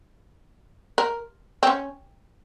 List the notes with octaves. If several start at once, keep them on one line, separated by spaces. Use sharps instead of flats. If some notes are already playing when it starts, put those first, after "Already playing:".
A#4
C4
C#4